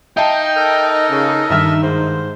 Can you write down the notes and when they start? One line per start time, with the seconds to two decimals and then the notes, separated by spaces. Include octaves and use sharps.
0.17 D#4 E5 F5 G5 A5
0.56 A4 A#4 D#5
1.10 C#3
1.50 G2 D#3 E5 F6
1.82 G#2 C5